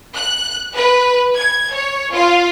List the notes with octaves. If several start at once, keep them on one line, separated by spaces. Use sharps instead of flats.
F#6
B4
G#6
C#5
F4